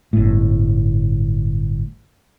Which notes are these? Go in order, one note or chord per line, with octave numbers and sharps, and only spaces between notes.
G1 A2